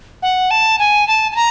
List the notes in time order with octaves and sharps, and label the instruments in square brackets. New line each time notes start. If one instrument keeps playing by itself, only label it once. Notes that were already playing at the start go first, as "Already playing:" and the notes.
[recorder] F#5
A5
G#5
A5
A5
A#5